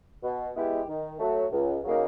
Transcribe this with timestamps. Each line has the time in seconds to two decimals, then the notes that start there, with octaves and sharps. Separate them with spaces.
0.23 B2
0.55 G#3 B3 E4 G4
0.88 D#3
1.20 F#3 A3
1.52 C#2
1.84 C#3 F#3 A#3 D#4